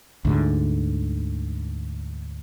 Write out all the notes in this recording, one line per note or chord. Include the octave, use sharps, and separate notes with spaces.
D2 G#2 D3